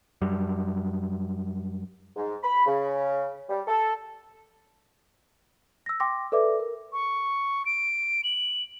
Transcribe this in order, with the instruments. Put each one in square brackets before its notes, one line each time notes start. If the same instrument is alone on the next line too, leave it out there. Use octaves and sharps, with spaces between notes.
[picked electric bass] F#2 G3
[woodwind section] G#2
B5
C#3
G3
A4
[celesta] E6 A#6
G5 C6 D6 A#6
A4 B4 D5 E5 D6
A#4
[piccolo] C#6
D7
F#7